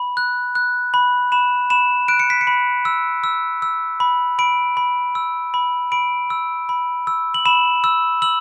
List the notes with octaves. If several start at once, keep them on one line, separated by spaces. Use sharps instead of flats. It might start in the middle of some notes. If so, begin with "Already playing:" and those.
Already playing: B5
F#6
F#6
B5
B5 E7
B5 E7
F#6 D7
C#7
B6
C#7
B5
E6
E6
E6
B5
B5 D7
B5
E6
B5
B5 D7
E6
B5
E6
F#7
B5 E7
E6
E6 F#7